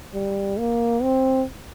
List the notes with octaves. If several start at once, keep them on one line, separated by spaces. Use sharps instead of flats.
G3
A#3
C4